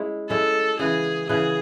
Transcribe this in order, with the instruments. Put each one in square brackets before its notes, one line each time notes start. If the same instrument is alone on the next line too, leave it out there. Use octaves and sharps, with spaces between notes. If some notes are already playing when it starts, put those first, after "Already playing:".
Already playing: [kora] G#3 C#4 E4
[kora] G#3 C#4 E4 [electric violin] A4
[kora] C#3 E3 B3 [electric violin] G#4
[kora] C#3 E3 B3 [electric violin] G#4